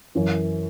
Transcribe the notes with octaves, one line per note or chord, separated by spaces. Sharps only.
F#2 E3 C#4